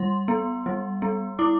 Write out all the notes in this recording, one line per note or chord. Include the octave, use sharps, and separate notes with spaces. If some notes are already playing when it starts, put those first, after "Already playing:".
Already playing: G3 C6
B3
G3
B3
E4 D6